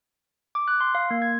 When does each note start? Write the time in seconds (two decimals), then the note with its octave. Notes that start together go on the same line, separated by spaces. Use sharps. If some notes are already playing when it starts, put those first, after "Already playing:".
0.55 D6
0.68 F#6
0.81 C6
0.95 F5
1.10 A#3
1.22 G#6